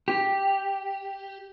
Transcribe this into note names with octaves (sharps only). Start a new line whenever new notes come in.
G4